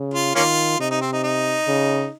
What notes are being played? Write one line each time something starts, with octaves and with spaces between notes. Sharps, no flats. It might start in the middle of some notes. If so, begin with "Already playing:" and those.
Already playing: C#3
F4
D#3 A#3 C#4 F4
C3 D#4
D#4
C4
D#4
D#4
C#3